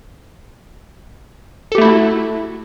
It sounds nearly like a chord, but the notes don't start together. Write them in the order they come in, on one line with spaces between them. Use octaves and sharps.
A4 G4 A3 E4 F#4